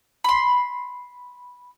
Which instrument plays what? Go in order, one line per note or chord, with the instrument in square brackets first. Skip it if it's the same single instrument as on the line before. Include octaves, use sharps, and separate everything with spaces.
[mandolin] B5 C6